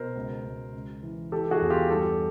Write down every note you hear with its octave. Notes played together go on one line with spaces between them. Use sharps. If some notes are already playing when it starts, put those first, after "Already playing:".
Already playing: B2 A#4 C5
C#2
C#2
C#2
E3
E3 G4 A4
F#4 G#4
E2
F4 G4
G2 G4 A4